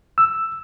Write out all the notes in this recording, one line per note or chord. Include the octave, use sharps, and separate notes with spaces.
E6